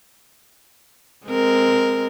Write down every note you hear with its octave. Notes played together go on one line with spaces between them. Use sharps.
G#3 C4 A#4